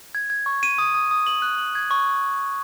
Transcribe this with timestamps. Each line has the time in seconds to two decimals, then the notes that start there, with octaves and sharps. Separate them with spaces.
0.15 G#6
0.30 G#6
0.46 C#6
0.63 D#7
0.78 D#6
0.94 D#6
1.11 D#6
1.27 F#7
1.42 F#6
1.58 F#7
1.75 G#6
1.91 C#6